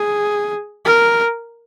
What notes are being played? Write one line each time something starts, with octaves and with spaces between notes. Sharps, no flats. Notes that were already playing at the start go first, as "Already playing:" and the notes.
Already playing: G#4
A#4